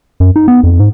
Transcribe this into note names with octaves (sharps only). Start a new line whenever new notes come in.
F#2
D#4
B3
F2
G#2